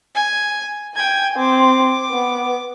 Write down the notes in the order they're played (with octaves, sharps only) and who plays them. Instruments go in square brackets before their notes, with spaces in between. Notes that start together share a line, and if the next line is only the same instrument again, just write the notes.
[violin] G#5
[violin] G5 G#6 [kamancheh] G#5
[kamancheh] C4 [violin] D6
[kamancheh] B3